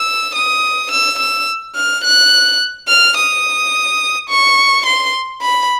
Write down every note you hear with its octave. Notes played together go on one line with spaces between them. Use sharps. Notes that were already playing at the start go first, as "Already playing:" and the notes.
Already playing: E6
D#6
E6
E6
F6
F#6
F6
D#6
C#6
C6
B5